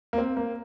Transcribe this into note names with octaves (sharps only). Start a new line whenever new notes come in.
A#3
C4
A#3